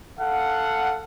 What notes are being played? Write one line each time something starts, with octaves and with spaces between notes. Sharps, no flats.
A4 F5 F#5